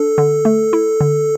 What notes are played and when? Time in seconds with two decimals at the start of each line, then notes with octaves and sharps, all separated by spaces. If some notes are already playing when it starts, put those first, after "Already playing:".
Already playing: D4 A4
0.18 D3
0.45 A3
0.73 E4
1.01 D3